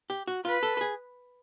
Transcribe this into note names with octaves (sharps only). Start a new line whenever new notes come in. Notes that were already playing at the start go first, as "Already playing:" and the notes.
G4
F#4
F4 B4
A4
A4
G#4